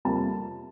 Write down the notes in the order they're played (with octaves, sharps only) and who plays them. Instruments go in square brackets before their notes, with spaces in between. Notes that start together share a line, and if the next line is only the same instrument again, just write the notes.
[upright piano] F2 C3 G3 A#3 A5